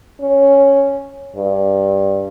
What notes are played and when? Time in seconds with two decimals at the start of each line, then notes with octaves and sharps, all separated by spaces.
0.21 C#4
1.36 G2